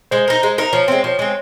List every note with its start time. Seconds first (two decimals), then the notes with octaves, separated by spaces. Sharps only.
0.11 G#3 C5
0.28 D#4 A#4
0.43 G#3
0.58 D#4 A#4
0.73 F3 C#5
0.88 G#3 C4
1.03 F3 C#5
1.19 G#3 C4